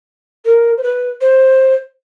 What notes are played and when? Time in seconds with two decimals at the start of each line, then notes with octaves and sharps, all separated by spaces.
0.45 A#4
0.77 C5
0.83 B4
1.21 C5